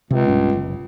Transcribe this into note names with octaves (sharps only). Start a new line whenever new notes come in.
C#2 C3
B1 G2 C#4
F#1